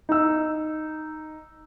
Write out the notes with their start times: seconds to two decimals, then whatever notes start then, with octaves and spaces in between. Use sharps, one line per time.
0.09 D#4 E6